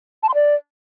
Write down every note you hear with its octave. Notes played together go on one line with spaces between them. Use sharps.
A5
C6
D5